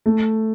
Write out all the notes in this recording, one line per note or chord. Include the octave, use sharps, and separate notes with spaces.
A3